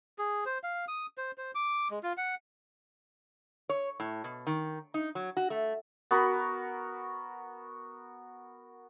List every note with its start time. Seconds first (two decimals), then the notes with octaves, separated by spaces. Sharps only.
0.18 G#4
0.46 C5
0.64 F5
0.88 D#6
1.18 C5
1.38 C5
1.55 D6
1.91 G#3
2.03 F4
2.17 F#5
3.69 C#5
4.00 A2
4.24 B2
4.47 D#3
4.94 D#4
5.15 F#3
5.37 F#4
5.50 A3
6.11 B3 F#4 A#4 B5